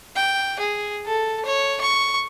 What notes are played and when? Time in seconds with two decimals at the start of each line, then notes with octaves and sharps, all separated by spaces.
0.16 G5
0.60 G#4
1.06 A4
1.45 C#5
1.81 C#6